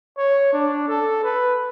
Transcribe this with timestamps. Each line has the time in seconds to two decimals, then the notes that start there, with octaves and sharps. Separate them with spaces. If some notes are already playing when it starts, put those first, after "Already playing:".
0.18 C#5
0.53 D4
0.88 A4
1.24 B4